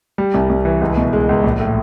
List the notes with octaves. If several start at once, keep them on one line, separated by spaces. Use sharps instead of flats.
G3
C2
C2
E3
C#2
B2
G#3
C#2
A#1
A2